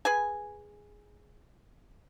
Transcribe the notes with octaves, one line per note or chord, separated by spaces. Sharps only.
G#4 B4 G#5